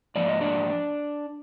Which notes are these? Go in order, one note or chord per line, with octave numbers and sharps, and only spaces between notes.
G#2 F3 A#3 D5
D#5
D4 D5